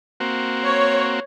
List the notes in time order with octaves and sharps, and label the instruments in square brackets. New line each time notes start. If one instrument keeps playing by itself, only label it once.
[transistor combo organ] A#3 C4 F#4
[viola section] C#5